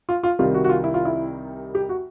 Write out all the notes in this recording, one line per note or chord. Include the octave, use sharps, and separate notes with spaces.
F4
F4
C2 C3 D#3 G3 F4
F#4
F#4
F4
E4
F4
E4
G4
F#4